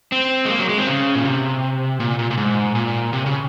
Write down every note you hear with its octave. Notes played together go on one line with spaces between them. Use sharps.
C4
G#3
A#3
F#3
G#3
C4
C#3
A#2
C3
A#2
A#2
A#2
G#2
A#2
C3
C#3